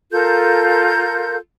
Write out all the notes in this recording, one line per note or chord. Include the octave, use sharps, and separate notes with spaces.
F4 A4 A#4 G6